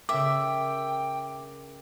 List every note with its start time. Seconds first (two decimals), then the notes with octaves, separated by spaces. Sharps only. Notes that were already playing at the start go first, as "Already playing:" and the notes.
0.09 C#3 C#4 A#4 E5 G5 D6